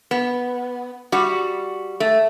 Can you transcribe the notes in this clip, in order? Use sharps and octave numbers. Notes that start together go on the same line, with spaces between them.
B3
G3 F#4
A3